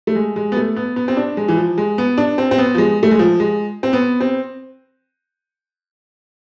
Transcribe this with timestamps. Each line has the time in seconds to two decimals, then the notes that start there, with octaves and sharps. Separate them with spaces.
0.07 A3
0.15 G#3
0.36 G#3
0.52 B3
0.56 A3
0.76 B3
0.96 B3
1.08 C4
1.17 D4
1.37 G#3
1.48 E3
1.57 F3
1.78 G#3
1.98 B3
2.18 D4
2.38 C4
2.51 C4
2.58 B3
2.75 F3
2.78 G#3
3.03 A3
3.11 G#3
3.19 F3
3.40 G#3
3.83 C4
3.93 B3
4.20 C4